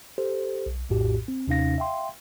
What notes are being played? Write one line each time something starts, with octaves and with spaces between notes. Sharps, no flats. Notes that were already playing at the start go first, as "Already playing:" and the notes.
G4 A4 C5
B1
A#1 F2 A2 F#4 G4
C4
D#2 C3 C#4 D#4 F5 A#6
E5 F5 G5 C6